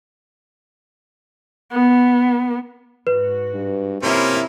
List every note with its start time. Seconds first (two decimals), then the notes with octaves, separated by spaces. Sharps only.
1.72 B3
3.07 G#2 F#4 B4
3.53 G2
4.03 C3 A#3 C#4 E4 F4